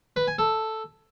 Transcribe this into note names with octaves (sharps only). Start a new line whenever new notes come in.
B4
G#5
A4